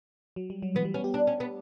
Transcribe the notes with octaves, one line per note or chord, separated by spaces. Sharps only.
F#3
G3
F#3
E3 B3
G3
B3 C#4
G4
D4
C#4
B3